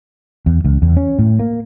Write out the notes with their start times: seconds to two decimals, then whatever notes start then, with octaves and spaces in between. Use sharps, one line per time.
0.46 E2
0.64 C#2
0.82 E2
0.97 C#4
1.19 A2
1.39 A#3